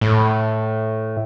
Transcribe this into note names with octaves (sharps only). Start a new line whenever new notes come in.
A2